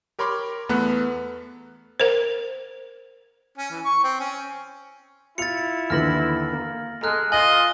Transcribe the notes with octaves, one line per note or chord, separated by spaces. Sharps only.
G4 A#4 C#5 B5 C6 D6
E2 A3 B3 B4 F#5 F#6
A#4 C5
C#4
E3
C#6
C4
C#4
E4 F4 A6 C#7 F7
D#2 D3 E3 F6 A#6 F#7
A#3
G#3 A4 A#5 F6 F#6
F4 D#5 G#5 F#7